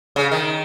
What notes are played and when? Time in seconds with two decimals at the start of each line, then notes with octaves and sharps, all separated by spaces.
0.16 C#3
0.31 D#3